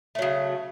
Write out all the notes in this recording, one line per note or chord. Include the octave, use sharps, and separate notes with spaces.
C#3 F#3 A3